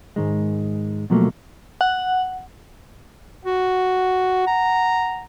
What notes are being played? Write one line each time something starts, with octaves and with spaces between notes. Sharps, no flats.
G#2 D#3 G#3
B2 F3 F#3 A3 A#3
F#5
F#4 F#5
A#5